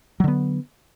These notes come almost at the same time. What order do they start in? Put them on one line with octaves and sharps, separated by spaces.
F#3 D3 B3